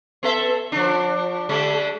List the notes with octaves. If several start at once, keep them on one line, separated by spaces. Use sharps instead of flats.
B3 A4 E5
F3 D4
D3 G3 G#3